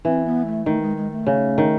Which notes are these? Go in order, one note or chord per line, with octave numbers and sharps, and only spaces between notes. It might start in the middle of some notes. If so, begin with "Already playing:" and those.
E3 C4
B3
A3
D#3 A3
G#3
G#3
A3
C#3
D#3